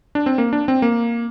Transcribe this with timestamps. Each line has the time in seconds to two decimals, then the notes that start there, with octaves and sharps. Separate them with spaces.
0.15 D4
0.26 C4
0.38 A#3
0.53 D4
0.68 C4
0.82 A#3